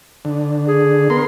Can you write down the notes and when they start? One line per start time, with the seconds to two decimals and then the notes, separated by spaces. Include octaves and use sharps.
0.25 D3
0.67 G#4
1.10 B3 A#4 C6